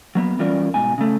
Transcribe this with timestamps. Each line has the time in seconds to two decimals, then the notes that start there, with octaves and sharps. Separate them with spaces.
0.15 F#3 A#3 B3
0.39 E3 G3 C#4 F4 A#4 D5
0.74 G#2 B2 G#5
0.98 C#3 A3